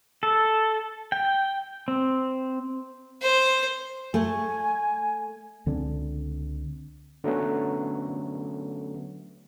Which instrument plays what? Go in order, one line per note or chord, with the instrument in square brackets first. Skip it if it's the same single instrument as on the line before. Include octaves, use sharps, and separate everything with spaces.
[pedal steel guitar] A4
G5
C4
[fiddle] C5
[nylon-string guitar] A3 [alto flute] G#5
[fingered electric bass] C#2 D3 C4 D4
[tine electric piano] D3 F#3 A3 B3 C#4